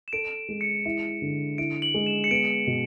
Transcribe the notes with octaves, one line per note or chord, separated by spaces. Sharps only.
E7
A4 D7
G#3
C#7
E4
D3
E4 D7
F#7
G#3
E7
C#7
B3 D7
B2